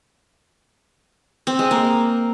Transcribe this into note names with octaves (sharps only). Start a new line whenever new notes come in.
C4
G#3
A#3